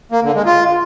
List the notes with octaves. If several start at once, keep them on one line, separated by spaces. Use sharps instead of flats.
A#3
D3
G#3
F4